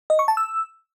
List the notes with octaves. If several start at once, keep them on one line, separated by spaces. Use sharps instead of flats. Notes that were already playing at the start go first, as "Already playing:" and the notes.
D#5
C#6
A5
E6